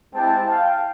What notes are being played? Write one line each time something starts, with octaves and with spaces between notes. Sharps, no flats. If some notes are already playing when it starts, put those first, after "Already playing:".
G#3 C4 E4 G4 G5 A5
F5 G5